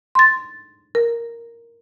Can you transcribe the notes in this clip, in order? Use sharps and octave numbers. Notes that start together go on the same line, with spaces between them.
C6 A6
A#4